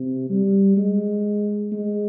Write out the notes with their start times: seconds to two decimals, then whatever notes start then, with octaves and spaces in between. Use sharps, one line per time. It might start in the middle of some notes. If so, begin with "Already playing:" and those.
Already playing: C3
0.30 G3
0.78 G#3
1.73 G#3